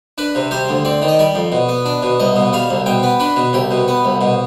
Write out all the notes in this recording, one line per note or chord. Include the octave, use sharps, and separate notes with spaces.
D4 B4
C3
G3 C5
D2
C4 D5
D#3
D#5
G3 D5
F2
B2
B3
D4
B2
C2 D#5
B2
G3 F5
C2
B2 G5
B3
D4 B4
B2
C2 G4
B2
B3
C2
B2